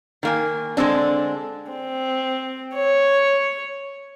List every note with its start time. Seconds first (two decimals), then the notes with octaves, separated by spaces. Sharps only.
0.23 D#3 A#3 G#5
0.77 D3 G#3 A3 C4 D4
1.71 C4
2.76 C#5